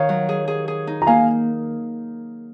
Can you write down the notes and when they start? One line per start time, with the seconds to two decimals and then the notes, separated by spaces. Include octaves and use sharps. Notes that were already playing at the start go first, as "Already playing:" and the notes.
Already playing: D#3 C#5 F5
0.09 F#3
0.29 G#4
0.48 G#4
0.68 G#4
0.87 D#4
1.02 A#5
1.07 A#3 F5 G#5